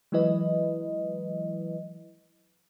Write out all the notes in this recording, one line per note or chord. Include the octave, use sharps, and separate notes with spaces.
E3 F#3 G#3 E4 B4 D#5